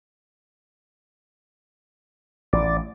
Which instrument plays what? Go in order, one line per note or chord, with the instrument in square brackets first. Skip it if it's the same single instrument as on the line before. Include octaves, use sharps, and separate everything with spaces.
[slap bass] A1 [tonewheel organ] D5